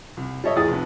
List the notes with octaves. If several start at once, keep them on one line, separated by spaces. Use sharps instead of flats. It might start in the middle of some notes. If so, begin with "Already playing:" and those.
C2
G3 A4 C#5 D#5 E5
E2 A2 G#4 D#6 A6
F1 F2 B3